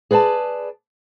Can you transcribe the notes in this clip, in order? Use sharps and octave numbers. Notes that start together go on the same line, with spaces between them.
G#4 B4 D5 G5 A5